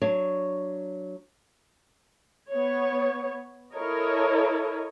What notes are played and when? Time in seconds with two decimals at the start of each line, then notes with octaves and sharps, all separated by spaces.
0.02 F#3 D4 C#5
2.51 B3 C#5
3.74 E4 A4 A#4 C#5 D#5